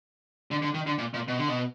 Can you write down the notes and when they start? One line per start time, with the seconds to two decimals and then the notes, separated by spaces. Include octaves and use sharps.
0.51 D3
0.62 D3
0.74 D#3
0.86 D3
0.98 A#2
1.14 A#2
1.28 B2
1.39 D3
1.48 B2